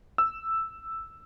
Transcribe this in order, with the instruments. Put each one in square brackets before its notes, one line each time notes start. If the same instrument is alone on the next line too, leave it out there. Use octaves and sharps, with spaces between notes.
[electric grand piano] E6